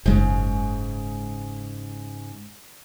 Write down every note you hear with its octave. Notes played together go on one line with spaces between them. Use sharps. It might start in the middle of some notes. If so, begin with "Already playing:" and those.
F#1 G#2 C#3 G#3